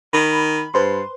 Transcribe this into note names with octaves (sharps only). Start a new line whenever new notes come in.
D#3 B5
G2 B4 C5 C6